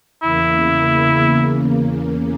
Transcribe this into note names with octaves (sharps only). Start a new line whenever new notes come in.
E2 C#3 A#3 E4